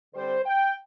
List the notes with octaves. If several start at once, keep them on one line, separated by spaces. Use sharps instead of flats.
D3 G3 C4 C5
G5